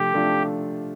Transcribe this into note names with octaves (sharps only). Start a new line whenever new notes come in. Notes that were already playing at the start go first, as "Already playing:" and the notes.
Already playing: C3 F3 A3 D4 G4
C3 F3 A3 D4 F4